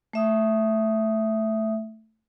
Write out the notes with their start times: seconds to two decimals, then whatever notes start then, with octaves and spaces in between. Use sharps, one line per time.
0.13 A3 E5 D#6